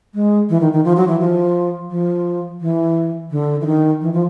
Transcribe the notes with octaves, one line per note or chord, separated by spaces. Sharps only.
G#3
E3
D#3
D#3
F3
F#3
E3
F3
F3
E3
D3
E3
D#3
E3
F3